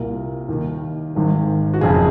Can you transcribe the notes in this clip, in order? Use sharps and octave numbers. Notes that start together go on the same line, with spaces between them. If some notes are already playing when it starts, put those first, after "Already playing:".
Already playing: C2 A#2 A#4
D#2 D#3
G#1 G#2 D#3
F#4
F#1 F2 C#3 G#4